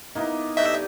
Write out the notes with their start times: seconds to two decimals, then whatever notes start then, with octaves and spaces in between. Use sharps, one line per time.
0.15 A#3 B3 D#4 E4
0.57 G2 A3 B4 D#5 E5